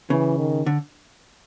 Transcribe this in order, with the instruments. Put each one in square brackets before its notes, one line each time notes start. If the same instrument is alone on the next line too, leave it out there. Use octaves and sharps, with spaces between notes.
[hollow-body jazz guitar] C#3 [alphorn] E3
[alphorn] D#3
[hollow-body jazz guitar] D3